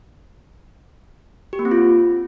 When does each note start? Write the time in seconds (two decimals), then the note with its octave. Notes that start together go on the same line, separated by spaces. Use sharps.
1.53 G4
1.59 A#3
1.65 C4
1.71 F4